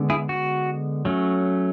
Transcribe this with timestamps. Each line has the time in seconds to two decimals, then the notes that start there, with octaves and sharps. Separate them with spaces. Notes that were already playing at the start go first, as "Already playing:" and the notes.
Already playing: D3 G#3 B3
0.10 E4 G#4
0.29 F#4
1.05 F#3 A3 C#4